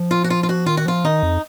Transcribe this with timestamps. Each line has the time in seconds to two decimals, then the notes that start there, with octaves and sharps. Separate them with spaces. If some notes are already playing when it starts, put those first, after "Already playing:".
Already playing: F3
0.11 F4
0.24 F#4
0.30 F4
0.43 F4
0.49 F#4
0.66 D#3 F4
0.77 F#4
0.86 F3 F4
1.04 D#3 D#4
1.23 F2